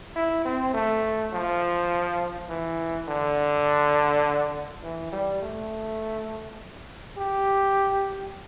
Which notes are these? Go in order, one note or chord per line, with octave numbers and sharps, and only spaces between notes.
E4
C4
A3
F3
E3
D3
E3
G3
A3
G4